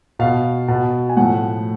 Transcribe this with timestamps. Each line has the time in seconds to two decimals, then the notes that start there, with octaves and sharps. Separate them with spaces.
0.19 B2 F5
0.68 B2
1.09 G#5
1.17 A2 F3 F#5